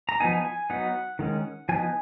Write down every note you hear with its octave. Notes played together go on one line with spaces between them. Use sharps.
A#5
F3 B3 D#4 G#5
G#5
F#3 B3 D#4 F#5
D#3 G#3 C#4
F3 B3 D#4 G#5